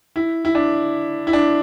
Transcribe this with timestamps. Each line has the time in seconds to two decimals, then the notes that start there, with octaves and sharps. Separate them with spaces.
0.16 E4
0.45 E4
0.55 D4
1.27 E4
1.33 D4